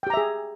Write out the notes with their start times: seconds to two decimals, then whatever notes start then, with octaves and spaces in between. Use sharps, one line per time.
0.03 G5
0.07 G4
0.10 A#5
0.14 E5
0.17 G#4